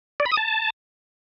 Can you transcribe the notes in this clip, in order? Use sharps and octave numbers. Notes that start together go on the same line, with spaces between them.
D5
B5
D#6
A5